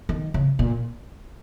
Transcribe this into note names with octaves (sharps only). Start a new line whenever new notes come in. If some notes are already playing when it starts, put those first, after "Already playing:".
D#3
C#3
A#2